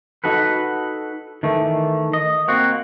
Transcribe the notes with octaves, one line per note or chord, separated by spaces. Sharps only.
D#4 F#4 A4 B4
D#3 E3 A3
D#5
A#3 C4 F#4